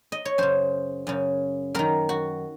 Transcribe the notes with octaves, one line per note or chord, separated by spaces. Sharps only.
D#5
C#5
F#2 C#3 C5
F#2 C#3
F#2 D#3 A#4
F#4